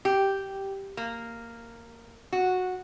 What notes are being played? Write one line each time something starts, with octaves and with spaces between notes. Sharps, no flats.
G4
A#3
F#4